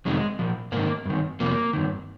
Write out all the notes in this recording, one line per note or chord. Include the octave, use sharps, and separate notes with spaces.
F2 C3 D#3 G#3
A#2 F3
G#2 D#3 A#3
G2 D#3
F2 C3 F3 A#3
G2 D#3